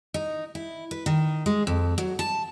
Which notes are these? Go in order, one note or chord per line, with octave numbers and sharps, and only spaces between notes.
D#4
E4
B4
D#3
G#3
F2
F#3
A5